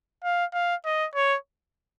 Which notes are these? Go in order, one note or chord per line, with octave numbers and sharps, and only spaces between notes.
F5
F5
D#5
C#5